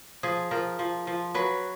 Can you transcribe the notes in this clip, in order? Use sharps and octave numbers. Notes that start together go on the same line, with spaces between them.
F3 G#4
F3 A#4
F3
F3
F#3 B4